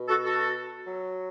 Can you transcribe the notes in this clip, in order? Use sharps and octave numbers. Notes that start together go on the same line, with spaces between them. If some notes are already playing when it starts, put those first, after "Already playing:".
Already playing: B2
F#4 A4
F#4 A4
F#3